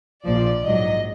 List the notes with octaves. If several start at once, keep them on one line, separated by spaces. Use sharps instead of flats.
A#1 A#2 F3 D5
A#1 G#2 F#3 D#5